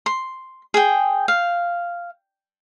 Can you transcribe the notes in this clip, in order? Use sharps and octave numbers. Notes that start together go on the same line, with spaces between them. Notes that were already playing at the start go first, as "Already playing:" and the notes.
C6
G#4 G5
F5